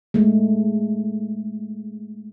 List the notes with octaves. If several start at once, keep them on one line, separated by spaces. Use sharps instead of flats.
G#3 A3